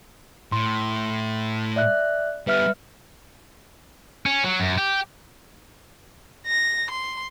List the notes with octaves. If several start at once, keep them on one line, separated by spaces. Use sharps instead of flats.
A2 C6
D5 E5 F#6
G3 B3 B4 E5 F6
C#4
F#3
F#2
G4
A#6
C6